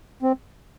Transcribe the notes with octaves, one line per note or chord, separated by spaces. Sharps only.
C4